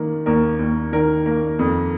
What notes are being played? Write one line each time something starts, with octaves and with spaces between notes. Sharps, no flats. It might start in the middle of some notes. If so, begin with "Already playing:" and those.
Already playing: D#3 A#3
D#2 A#4
D#2
D#3 A#4
A#3
F2